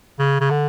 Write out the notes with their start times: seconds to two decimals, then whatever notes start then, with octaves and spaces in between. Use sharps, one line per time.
0.19 C#3
0.40 C#3
0.50 D3